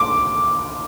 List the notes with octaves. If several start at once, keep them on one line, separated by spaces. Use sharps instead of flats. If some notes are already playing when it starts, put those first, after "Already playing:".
Already playing: D6